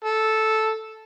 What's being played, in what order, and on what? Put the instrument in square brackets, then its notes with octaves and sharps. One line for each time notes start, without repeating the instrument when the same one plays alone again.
[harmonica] A4